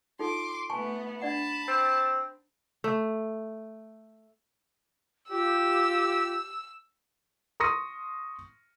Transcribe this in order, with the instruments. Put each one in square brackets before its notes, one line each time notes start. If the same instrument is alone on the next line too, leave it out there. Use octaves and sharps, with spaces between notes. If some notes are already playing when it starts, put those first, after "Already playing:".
[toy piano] D#4 F4 A4 [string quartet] C6 D6
[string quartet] A3 B3 [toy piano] G#5 A5 C#6
[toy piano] D4 D5 F#5 [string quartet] A5 B5
[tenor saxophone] C4
[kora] A3
[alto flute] F4 [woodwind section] G4 [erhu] E6
[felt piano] C6 C#6 D#6 A#6 C#7 D#7